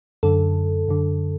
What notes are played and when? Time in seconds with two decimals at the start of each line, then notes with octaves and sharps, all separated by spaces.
0.23 F#2 D3 A4
0.88 F#2 D3